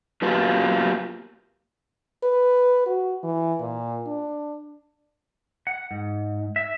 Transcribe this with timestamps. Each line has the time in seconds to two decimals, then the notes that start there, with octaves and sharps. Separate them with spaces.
0.22 F#3 A#3 B3 F4 G4 B4
2.23 B4
2.86 F#4
3.24 E3
3.60 A#2
4.07 D4
5.67 F#5
5.91 G#2
6.56 E5